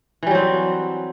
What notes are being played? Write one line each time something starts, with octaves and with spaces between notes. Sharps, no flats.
E3 F#3 G3 C4